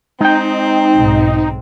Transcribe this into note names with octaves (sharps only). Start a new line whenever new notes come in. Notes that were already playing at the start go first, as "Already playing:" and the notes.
G#3 C4 D#4 G5
B1 G#2